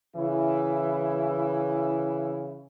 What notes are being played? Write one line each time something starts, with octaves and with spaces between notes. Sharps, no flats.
C#3 E3 E4